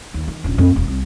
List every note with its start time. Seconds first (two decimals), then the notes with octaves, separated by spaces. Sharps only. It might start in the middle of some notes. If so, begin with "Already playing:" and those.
0.14 D#2
0.28 D#3
0.44 D#1 A#1
0.58 F2 A#3
0.76 D#1
0.88 C2